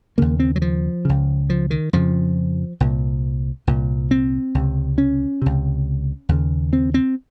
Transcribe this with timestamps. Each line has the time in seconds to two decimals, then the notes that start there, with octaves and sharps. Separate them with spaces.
0.18 D#2 C#3 A#3
0.40 C4
0.56 F#3
0.62 F3
1.05 C#2 C#3
1.50 F3
1.70 D#3
1.93 F2 C#3 F3
2.80 C2 A#2
3.67 C2 A#2
4.11 C4
4.55 C#2 C3
4.98 C#4
5.42 C#2 C3
6.29 D#2 C#3
6.73 C4
6.94 C4